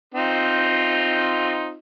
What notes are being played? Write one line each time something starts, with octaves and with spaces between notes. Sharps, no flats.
C4 D#4 F4